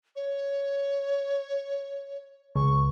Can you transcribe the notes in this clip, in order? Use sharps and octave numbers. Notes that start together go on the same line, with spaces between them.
C#5
C#2 C#6